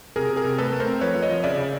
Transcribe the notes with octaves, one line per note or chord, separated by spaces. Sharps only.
C3 G#4 A#4
C3
G#4 A#4
C3
A3 A4 B4
A3
A#4 C5
C4
F3 B4 C#5
F3
C#5 D#5
F3
C#3 D5 E5
C#3